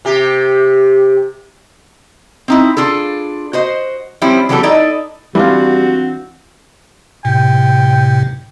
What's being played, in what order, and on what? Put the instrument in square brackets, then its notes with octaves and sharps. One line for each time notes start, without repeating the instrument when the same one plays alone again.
[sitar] C3 G4
[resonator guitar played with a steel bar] C4 D#4 E4
D4 F4 G#4 A4
F#4 C5 D#5
F3 G3 C4 C#4 E4
E3 F#3 G3 B3 G4 A4
D#4 E4 A4 D5 D#5
[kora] E3 D4 F4 [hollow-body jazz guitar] G3 [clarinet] C4 [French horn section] F#4
[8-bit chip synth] A2 C3 [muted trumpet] G5